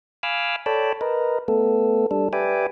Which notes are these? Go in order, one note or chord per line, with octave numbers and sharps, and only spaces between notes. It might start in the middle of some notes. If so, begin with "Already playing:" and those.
F5 G#5 B5 D6 E6 F6
A4 C#5 D5 G5 A5 B5
A#4 B4 D#5
A3 B3 A4
G3 D4 A4
G4 B4 D5 E5 G5 G#5